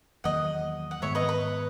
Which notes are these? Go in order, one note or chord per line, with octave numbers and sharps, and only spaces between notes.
E2 D#3 F#3 A#3 D#5 F#5
F#5
G#2 D#3 G#3 B3 C#5 E5
B4 D#5
B4